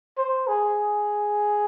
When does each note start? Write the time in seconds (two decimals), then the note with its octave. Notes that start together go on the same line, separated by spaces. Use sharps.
0.18 C5
0.48 G#4